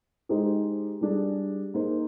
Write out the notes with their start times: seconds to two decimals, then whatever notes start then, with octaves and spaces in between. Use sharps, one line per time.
0.29 G#3 D#4 G4 C5
1.01 G3 D4 G#4
1.74 A#3 D#4 G#4 C5